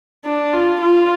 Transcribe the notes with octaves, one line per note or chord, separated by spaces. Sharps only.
D4
F4
F4